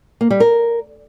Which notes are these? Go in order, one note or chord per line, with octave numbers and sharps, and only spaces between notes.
A#3
G3
A#4